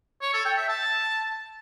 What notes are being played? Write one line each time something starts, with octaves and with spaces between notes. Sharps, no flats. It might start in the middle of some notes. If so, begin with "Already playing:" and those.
C#5
A4
G5
E5
A5